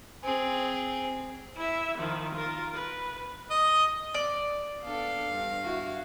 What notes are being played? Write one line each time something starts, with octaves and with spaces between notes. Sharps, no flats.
C4 G#4
E4 E5
D#3 F3
F4 A#4
B4
D#5
D5
B3 D4 A4 F5
G2
E4 F#4